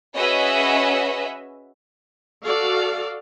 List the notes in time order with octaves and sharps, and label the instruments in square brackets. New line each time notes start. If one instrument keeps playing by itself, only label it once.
[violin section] C#4 F#4 G#4 B4 D#5 E5
[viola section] F#4 A4 D5 F5